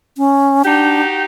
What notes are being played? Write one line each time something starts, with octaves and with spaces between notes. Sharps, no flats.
C#4
D4 D#4 F#4 G4